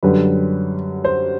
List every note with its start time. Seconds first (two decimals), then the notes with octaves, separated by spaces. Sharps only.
0.03 F#2 D3 G3 B4
1.05 C5